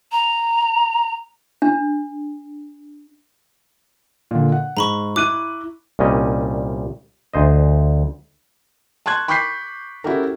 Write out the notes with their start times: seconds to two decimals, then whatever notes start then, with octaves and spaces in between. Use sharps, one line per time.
0.12 A#5
1.62 D4
4.31 A#2 D3
4.52 F#5
4.77 G#2 A#5 B5 C#6
5.16 E4 D6 F#6 D#7
5.99 C2 A#2 G3 C#4 D#5
7.34 D2 C5 D#5
9.06 A5 C6 C#6 F#6 G#6
9.28 B5 C#6 D6 G6 B6 C7
10.04 C#4 E4 F#4 G4 A4 A#4